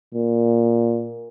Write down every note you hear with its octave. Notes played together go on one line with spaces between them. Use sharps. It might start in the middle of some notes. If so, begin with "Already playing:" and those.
A#2